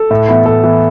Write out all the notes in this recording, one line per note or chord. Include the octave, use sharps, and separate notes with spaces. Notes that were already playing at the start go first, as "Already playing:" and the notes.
Already playing: A4
A2
E3 B3
A2 A4
E3 B3